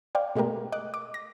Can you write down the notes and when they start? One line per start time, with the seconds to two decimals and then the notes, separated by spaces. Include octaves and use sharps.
0.15 C5 D5 F5 G5
0.35 B2 G#3 A3 G4 A#4
0.72 D#5 D6 F#6
0.94 D6
1.14 A#6